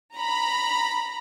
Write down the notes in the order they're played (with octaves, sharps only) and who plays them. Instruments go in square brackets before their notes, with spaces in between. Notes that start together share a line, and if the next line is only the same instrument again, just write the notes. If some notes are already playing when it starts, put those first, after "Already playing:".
[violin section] A#5 B5